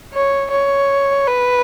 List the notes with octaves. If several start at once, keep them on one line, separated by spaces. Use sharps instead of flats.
C#5
C#5
B4